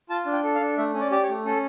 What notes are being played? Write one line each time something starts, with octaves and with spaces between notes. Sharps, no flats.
F4 A5
D4
G5
A4
F5
D4
A3 E5
C#4
D5
G4 D5
C#5
A3
C#4 A4